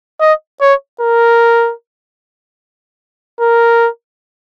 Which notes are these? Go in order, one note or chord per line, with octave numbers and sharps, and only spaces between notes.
D#5
C#5
A#4
A#4